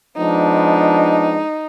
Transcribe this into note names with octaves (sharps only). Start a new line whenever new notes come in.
F3 G#3 B3 D4 D#4